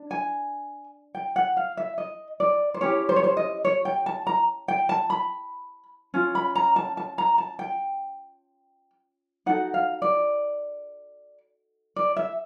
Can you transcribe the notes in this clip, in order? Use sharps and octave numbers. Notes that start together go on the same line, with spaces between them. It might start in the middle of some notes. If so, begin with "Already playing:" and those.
Already playing: D4
G#5
G5
F#5
F5
E5
D#5
D5
C5
C#4 E4 G4 C#5
C5
C#5
C5
D#5
C#5
G5
A5
A#5
G5
A5
B5
C#4 F4
B5
A#5
A5
A5
A#5
A5
G5
D#4 F#4 A4 F#5
F5
D5
D5
E5